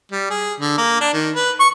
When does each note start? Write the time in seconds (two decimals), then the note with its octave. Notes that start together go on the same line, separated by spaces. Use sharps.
0.12 G3
0.30 G#4
0.60 D3
0.78 A#3
1.01 D4
1.14 D#3
1.35 B4
1.60 C#6